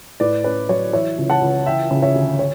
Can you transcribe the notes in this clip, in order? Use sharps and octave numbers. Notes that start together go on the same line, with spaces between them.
A2 B4 D5
C#4 B4
F#3 C#5
E3 C#5 E5
C#2
F#5 A5
C#2
E3 E5 G5
C#3
C#5 E5
D2
C#5